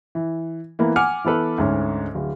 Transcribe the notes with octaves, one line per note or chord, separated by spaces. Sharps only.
E3
E3 A#3 B3
F#5 G#5 D6 F6 C#7
E3 B3 A4 B4
D2 G#2 C#4
D1